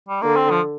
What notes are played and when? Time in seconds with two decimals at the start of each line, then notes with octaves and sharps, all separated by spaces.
0.09 G3
0.22 D3 A#3
0.36 C4
0.50 F3